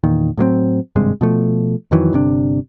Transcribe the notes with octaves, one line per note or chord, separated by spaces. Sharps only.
E2 A#2 D#3
A2 F#3 A#3 C4
G#1 G2 C3 G#3
B2 F3 A3
F2 D#3 E3 F#3
G1 C3 D4